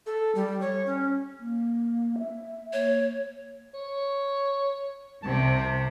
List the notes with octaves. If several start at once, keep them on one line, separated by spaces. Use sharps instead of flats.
A4
G3
C#5
C#4
A#3
E5
A#3 C#5
C#5
C2 C3 A5